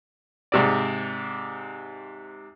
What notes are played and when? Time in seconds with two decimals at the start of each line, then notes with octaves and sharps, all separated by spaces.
0.52 G#2 C3 D5